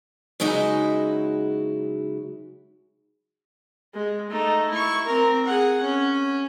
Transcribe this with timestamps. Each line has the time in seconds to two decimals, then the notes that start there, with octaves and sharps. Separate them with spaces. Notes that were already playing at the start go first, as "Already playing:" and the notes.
0.40 C#3 F#3 G#3 D#4 E4 F#4
3.94 G#3
4.30 A3 D#4
4.70 E4 C#6
5.06 C4 A#4
5.45 G#4 F#5
5.82 C#4